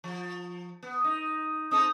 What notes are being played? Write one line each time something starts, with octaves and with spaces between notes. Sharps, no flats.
F3
B3
D#4
C4 D#4 A4 D#6